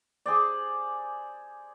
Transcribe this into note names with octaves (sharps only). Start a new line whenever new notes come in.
G#4 C5 D5